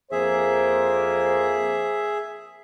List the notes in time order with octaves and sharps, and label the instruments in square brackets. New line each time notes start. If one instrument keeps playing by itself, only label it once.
[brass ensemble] F2 A#3 C5 [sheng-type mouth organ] G#4 E5